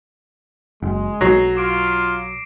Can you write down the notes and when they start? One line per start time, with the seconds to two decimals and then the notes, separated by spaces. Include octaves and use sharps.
0.82 F#1 G#3
1.21 B1 F#3 A#6 C7
1.57 F4 D6 D7
1.88 C7